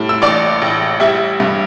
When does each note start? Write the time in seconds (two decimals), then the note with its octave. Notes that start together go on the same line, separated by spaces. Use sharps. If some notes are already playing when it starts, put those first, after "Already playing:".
Already playing: A2 G3
0.09 E6
0.22 A1 D5 D6
0.62 A1
1.00 G3 E4 E5
1.40 G2